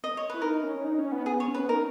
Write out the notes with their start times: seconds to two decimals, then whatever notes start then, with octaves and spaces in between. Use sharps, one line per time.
0.04 D#5
0.17 C#5
0.30 E4 B4
0.41 D#4 A#4
0.63 C#4
0.77 C#4
0.84 D#4
0.99 C#4
1.12 B3
1.26 B3 G#4
1.40 C#5
1.48 C#4
1.54 B4
1.59 B3
1.69 D#4 A#4